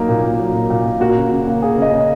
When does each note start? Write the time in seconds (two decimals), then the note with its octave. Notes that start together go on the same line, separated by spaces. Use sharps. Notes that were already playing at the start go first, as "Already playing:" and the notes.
Already playing: F#3 A#3 D#4
0.09 A#2
0.24 A#2
0.39 F#3
0.54 A#3
0.70 A#2
0.85 A#2
1.00 A#3 F#4
1.16 C#3
1.31 C#3
1.47 A#3
1.62 A#3 G#4
1.77 C#3
1.82 D#5
1.92 C#3